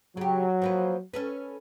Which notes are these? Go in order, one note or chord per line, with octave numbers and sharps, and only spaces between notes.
C#3 F#3 G4
F3 A#3 B4
C#4 A4 B4